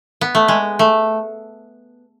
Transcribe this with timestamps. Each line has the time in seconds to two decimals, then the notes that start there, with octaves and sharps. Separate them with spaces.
0.21 B3
0.35 A3
0.48 G#3
0.79 A3